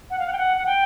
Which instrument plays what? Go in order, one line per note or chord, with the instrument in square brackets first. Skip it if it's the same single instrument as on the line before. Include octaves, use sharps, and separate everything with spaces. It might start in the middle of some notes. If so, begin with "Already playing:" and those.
[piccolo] F#5
F5
F#5
G5
F#5
F#5
G5